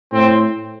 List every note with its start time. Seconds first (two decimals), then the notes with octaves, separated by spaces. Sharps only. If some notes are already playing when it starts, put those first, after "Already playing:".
0.13 A2 C4